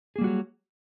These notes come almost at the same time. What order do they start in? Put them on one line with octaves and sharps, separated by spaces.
G#4 A#3 G3 F#4 F#3